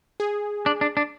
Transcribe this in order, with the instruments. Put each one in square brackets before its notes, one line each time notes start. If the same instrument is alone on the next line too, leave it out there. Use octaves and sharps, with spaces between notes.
[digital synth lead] G#4
[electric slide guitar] D4
D4
D4